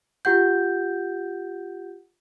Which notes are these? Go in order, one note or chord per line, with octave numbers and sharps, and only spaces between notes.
F4 G4 F#5 G6